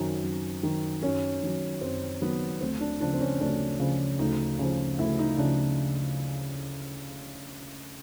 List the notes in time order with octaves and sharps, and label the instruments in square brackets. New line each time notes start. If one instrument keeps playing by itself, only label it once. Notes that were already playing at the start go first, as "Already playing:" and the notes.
Already playing: [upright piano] F#2 D#3 F#3 [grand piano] C4
[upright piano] F#2
D#3 F#3
[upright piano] F#2 [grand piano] C#4
[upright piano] D#3 F#3
[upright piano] F#2 [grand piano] C4
[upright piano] D#3 F#3 [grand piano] B3
[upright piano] D2 [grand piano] C4
[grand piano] D4
[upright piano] C#3 F3 [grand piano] D4
[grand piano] C4
C#4
[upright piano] D2 [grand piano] D4
[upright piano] C#3 F3
[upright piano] D2 [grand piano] D#4
[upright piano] C#3 F3
[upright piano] D2 [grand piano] E4
[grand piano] D#4
[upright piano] C#3 [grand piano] D4
[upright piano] F3